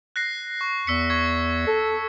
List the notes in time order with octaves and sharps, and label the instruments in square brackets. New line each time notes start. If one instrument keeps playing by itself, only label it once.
[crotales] F#6 A#6 C7
C#6
[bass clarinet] E2 [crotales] E6 B6 C#7
[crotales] C#6 G#6
[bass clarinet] A4